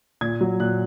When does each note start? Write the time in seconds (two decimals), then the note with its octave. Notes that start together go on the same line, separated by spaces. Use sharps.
0.21 A#2 G#6
0.41 F#3
0.60 A#2 F#6